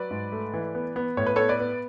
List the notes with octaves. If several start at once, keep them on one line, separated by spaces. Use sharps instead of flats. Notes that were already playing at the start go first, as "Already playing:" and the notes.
Already playing: F#3 B4 D5
G#2
A3
E3
B3
B3
A2 C#5
B4
B3 A4 C#5
B4 D5
B3